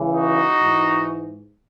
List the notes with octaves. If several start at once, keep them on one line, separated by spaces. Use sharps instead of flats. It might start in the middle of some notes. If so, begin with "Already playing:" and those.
Already playing: C#2 C#3 E3
D#4 F#4
G#2 E3